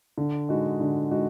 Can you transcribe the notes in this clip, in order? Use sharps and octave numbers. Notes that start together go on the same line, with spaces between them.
D3
G#3 D#4 F#4
D3
G#3 D#4 F#4